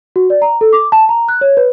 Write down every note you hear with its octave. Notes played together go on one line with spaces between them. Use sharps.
F#4
D5
A#5
A4
D6
A5
A#5
F#6
C#5
B4